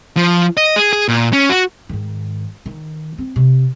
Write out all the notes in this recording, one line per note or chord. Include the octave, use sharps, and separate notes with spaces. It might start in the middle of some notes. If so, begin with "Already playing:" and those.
F3
D#5
G#4
G#4
A#2
C#4
F#4
G#2 D#3
D#3
C4
C3